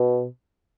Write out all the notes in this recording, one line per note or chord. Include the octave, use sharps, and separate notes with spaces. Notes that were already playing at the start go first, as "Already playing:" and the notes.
Already playing: B2